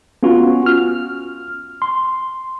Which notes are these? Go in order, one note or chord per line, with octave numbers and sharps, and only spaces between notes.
B3 C#4 F4 F#4
F6
C6